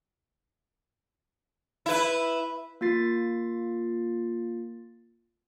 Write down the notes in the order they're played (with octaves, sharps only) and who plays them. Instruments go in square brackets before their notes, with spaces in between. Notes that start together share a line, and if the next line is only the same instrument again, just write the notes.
[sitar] E4 B4
[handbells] A#3 F4 A6 C7